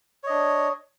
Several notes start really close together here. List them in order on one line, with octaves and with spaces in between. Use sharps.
C#5 D#5 D4